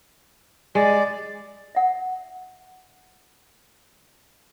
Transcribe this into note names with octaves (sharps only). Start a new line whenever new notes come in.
G#3 D5
E5 F#5